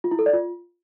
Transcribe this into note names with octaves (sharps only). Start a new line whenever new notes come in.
F4
E4
A4
D5
F4